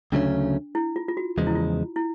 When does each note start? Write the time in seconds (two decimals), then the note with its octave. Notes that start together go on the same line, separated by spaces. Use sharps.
0.12 D2 C#3 F#3 A3 C#4 D4
0.75 E4
0.96 F4
1.08 F4
1.17 F#4
1.38 E2 C#3 F3 G#3 F4
1.47 E4
1.55 F4
1.96 E4